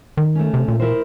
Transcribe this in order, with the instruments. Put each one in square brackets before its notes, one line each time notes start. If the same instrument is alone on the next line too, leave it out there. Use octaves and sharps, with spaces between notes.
[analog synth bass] D#3
[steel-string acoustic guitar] A3 C#4
[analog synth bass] C3
A#2
[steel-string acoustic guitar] E4 A#4 C5